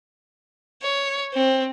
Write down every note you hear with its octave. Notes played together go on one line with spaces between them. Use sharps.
C#5
C4